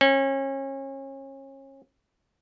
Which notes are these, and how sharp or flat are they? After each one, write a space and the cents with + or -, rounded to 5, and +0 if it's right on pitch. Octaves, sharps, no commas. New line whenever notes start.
C#4 -30